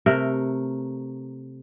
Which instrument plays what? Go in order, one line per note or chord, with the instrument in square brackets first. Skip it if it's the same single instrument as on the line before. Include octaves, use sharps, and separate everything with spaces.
[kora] C3 A3 A#4